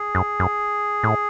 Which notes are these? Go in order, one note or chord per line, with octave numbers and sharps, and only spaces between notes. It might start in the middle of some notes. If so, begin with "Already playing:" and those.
Already playing: G#4
F#2
F#2
A2